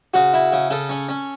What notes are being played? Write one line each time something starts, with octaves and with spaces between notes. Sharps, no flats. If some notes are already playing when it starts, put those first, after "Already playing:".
C#3 F#4
E4
C#3
C#3 A4
C#4
C#4